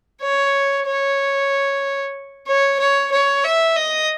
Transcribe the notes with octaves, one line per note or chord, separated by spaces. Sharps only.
C#5
C#5
C#5
C#5
C#5
E5
D#5